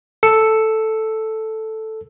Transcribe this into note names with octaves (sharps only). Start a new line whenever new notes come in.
A4 E6 C#7